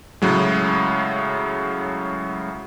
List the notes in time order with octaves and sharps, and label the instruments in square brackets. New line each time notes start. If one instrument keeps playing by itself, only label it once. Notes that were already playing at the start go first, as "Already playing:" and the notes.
[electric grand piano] A2 C#3 F#3 G#3